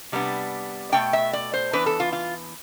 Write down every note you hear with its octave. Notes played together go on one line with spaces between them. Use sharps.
C3 G3 B3 D4
B2 A3 D4 G5
E5
D5
C5
E3 B3 D4 B4
A4
F4
F4